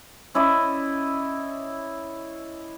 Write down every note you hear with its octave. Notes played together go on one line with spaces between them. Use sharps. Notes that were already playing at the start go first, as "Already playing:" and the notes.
C#4 E4 D5 D#5